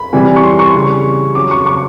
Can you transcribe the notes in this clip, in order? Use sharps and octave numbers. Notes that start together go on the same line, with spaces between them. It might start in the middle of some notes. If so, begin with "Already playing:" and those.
Already playing: B5
C3 E3 G3
C#6
C6
C#6
C#3 E3 G3
C#3 F#3 D6
C#6
C#6